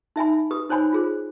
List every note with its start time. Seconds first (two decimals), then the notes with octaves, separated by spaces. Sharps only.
0.16 D#4 E5 G#5 B5
0.51 G4 B4 D#6
0.69 D#4 C5 C#5 G#5 B5
0.92 F4 G#4 C5